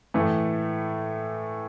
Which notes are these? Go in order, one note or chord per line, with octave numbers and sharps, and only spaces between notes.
A2 E3 A3